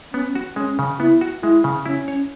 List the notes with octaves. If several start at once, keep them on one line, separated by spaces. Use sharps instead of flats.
B3 C#4
F#4
G#3 C#4
C#3
B3 E4
F#4
G#3 E4
C#3
C#4 E4
C#5